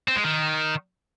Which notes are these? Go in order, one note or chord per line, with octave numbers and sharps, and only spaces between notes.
C4
G#3
D#3